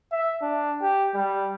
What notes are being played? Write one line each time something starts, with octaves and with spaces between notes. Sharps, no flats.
E5
D4
G4
G3